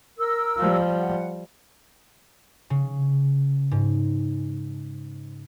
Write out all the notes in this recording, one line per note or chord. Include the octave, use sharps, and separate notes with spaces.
A#4 E6
F3 G3
F#5
C#3
G#2